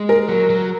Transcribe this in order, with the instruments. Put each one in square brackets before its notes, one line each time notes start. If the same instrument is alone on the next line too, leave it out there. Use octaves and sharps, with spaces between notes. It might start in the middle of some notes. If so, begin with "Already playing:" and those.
Already playing: [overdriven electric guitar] G#3
[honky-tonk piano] A#4
[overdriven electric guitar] F#3
F#3